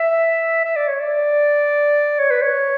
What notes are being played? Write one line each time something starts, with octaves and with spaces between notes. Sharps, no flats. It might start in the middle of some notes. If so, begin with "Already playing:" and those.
Already playing: E5
E5
D5
C#5
D5
C#5
B4
C#5